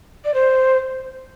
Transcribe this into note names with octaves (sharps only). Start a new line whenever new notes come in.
D5
C5